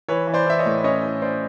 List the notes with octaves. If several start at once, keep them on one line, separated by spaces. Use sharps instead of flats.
E3 B4 C#5
E3
C5 D5
E3 E5
C#5 D#5
A2
C#4 C#5 D#5
A2
C#4 C5 D5